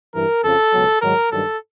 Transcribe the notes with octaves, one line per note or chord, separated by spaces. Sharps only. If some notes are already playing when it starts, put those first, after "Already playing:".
G2 E3 A#4
F2 C#3 F3 A4
C#2 B2 F#3
G#2 D#3 F#3 A#4
G2 D#3 F#3 A4